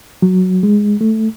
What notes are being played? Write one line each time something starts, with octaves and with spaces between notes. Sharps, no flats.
F#3
G#3
A3